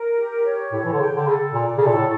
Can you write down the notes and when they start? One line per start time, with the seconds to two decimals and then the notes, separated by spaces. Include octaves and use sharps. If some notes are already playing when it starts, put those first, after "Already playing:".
Already playing: A#4
0.18 G4
0.45 C#5
0.72 A2 A4
0.85 E3
0.92 D3
1.00 C#3 G5
1.16 D3
1.27 C#3 A4
1.53 A#2 D5
1.77 C#3
1.81 A4
1.86 A#2
1.94 A2